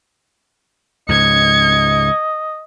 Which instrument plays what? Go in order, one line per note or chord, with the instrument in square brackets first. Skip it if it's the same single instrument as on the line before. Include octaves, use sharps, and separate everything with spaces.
[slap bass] C#2 G#2 [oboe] D#5 [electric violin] G#6 C#7